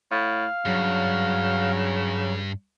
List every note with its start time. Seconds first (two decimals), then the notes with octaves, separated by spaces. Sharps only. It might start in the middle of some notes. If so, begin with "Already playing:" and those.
0.11 A2 F5
0.66 G2 C#3 F#3